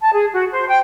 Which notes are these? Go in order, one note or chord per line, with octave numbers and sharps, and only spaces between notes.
A5
G#4
F#4
C5
G5